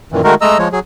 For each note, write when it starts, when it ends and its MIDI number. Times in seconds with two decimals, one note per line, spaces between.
0.12 0.21 42
0.12 0.21 46
0.12 0.21 51
0.12 0.21 52
0.24 0.35 51
0.24 0.35 56
0.24 0.35 57
0.24 0.35 63
0.24 0.35 66
0.24 0.35 70
0.41 0.58 56
0.41 0.58 57
0.41 0.58 75
0.41 0.58 82
0.41 0.58 88
0.58 0.68 53
0.58 0.68 56
0.58 0.68 73
0.72 0.79 54
0.72 0.79 68